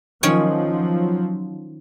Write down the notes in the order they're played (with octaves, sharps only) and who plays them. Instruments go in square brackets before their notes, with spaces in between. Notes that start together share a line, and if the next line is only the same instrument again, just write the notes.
[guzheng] D#3 C#4 C#5 [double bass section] F3 F#3